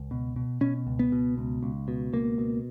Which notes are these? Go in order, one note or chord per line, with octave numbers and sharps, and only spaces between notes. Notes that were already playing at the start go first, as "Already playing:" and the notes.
Already playing: C#2
B2
B2
B2 C#4
C#2
B3
B2
C#2
C#2
B2
C#2 A#3
B2